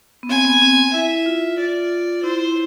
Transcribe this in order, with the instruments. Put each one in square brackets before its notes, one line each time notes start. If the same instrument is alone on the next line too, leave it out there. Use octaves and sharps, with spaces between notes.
[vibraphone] B3
[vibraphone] C4 [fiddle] G#5
[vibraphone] B3
C4
[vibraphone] E4 [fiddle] E5
[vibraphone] F4
[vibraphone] F4 [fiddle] D5
[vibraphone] E4 [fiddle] C5